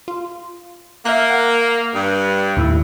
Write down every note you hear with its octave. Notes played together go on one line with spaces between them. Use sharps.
F4
A#3 E5 F5 F#6
F#5
G2
D#2 A2 E4